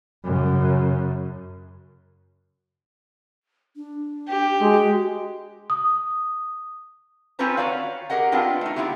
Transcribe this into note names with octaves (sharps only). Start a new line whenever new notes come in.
F#2 C#3
D4
G4
G#3 F#4
D#6
C4 C#4 F4 B4 C5 A#5
F#4 B4 C#5 D5 F5
G4 G#4 A#4 D#5 F#5
B3 C4 D4 F4 D#5 G5
A3 D#4
C3 A#3 B3 E4 F4 G4